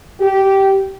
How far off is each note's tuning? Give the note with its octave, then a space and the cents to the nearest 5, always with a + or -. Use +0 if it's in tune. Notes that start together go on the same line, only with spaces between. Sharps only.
G4 -15